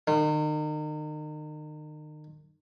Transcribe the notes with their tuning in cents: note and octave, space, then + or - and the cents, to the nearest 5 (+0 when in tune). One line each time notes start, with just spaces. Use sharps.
D#3 -35